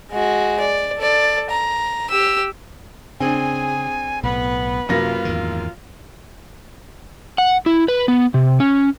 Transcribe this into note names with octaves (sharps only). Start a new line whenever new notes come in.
G#3 F#4
D5
A4 D5
A#5
G4 E6
C#3 C4 D4 G#4 G#5
B1 A2 B3 B4
F#2 C3 A#3 F4 A#6
E2 G#2 D#3
F#5
E4
B4
B3
C3
C#4